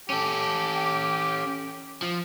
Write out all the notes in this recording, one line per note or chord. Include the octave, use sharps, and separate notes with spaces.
C#4 G4 A4
F3